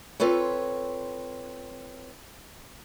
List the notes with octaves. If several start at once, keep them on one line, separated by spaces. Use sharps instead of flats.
C4 F4 A4 B4 C#5